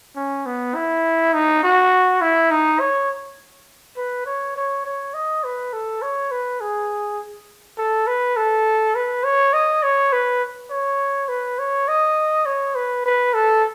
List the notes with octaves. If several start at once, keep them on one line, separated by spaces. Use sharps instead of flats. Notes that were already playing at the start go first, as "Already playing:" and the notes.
C#4
B3
E4
D#4
F#4
E4
D#4
C#5
B4
C#5
C#5
C#5
D#5
B4
A4
C#5
B4
G#4
A4
B4
A4
B4
C#5
D#5
C#5
B4
C#5
B4
C#5
D#5
C#5
B4
B4
A4